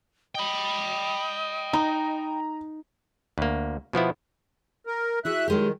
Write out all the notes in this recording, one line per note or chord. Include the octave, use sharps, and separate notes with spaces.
D#5 G5 B5
D#4 A#5
D2 A#3
B2 F3 B3 E4
A#4
E4 F#4 G#4 E5 F#6
D#3 F#3 G#3 G4